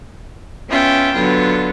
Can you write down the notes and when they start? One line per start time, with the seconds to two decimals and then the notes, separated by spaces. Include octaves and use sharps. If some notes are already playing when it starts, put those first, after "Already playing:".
0.69 B3 C#4 F4 E5 G5
1.15 D3 F#3 B3 F4